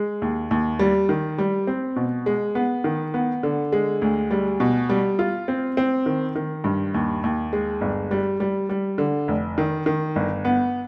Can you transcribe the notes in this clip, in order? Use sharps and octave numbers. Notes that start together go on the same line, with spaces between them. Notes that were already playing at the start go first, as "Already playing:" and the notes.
Already playing: G#3
D#2
D#2
G3
D#3
G3
C4
B2
G#3
B3
D#3
B3
D3
G#3
D2
G3
B2
G3
F4
C4
C4
D#3
D#3
G2
D#2
D#2
G#3
G1
G3
G3
G3
D3
F1
D#3
D#3
G1
B3